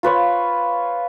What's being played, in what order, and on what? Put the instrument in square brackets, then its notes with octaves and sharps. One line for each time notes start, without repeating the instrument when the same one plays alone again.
[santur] F4 B4 C#5